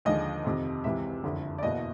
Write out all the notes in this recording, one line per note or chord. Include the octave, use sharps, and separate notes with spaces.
D#2 D3 F3 G#3 D#5
F2 C3 D#3
C#2 C3 E3 E5
F#1 F2 D3
D5
F#1 E2 B2 F#3 A#3 D#5